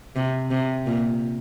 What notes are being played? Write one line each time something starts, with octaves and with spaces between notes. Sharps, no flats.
C3
C3
A#2